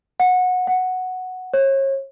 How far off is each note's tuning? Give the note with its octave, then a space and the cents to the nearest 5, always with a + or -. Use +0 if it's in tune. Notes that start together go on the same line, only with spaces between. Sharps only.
F#5 -20
F#5 +0
C#5 -35